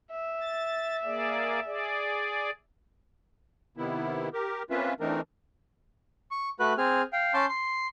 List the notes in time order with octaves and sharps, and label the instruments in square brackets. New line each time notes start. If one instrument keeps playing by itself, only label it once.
[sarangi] E5
[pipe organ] A6
A#3 G#4 D5
G#4 D5
[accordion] C3 D#3 B3 E4
G4 A#4
A#3 C4 C#4 F4 B4 E5
E3 A3 C4 D4 D#4 A#4
[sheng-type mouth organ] C#6
A3 F#4 B4 F#6
C4 G#4 F6
F5 G5
C#4 A5 C6 D6 G6
C6